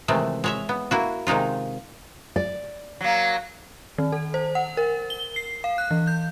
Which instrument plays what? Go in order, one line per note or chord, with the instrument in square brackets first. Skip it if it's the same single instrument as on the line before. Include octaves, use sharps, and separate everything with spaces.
[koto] C3 D#3 E3 G#3 A3
G#3 C#5 E5
B3
A#3 E4 F#4
C3 D#3 G#3 D#4 F4
[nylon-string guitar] D5
[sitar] F#3 A#3
[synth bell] D#3
A4
C5
F#5
A#4
G7
C7
F5
F#6
E3
G6